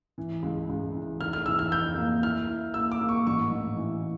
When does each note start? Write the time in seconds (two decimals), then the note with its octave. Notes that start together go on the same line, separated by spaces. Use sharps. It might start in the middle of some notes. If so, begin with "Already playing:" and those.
0.18 E3
0.42 C#2
0.69 C#2
0.95 E3
1.21 F1 F6
1.33 F6
1.46 E3 E6
1.59 F6
1.72 F2 G6
1.98 A#3
2.23 E4 F6
2.48 E4
2.74 A#3 E6
2.92 D6
3.01 A#3
3.09 C#6
3.26 A1 C#6
3.51 A1
3.77 E3